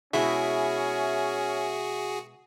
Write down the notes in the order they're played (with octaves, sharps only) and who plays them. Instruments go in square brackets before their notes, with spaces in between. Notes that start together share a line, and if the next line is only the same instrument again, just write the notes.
[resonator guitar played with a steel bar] B2 G#3 E4 [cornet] C#4 [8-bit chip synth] F#4 G#4 [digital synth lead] E5